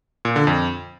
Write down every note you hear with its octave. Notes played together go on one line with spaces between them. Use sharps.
A#2
D3
F2